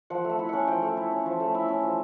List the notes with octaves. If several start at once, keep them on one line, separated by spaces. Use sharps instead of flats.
F3 F#5
A3 F#5
E4
C#4 F#5
F3 G5
A3
E4
C#4
F3
A3
E4
C#4
F3